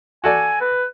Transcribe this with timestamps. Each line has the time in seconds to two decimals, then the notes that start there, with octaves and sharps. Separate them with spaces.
0.24 F#4 A4 D5 G#5
0.61 B4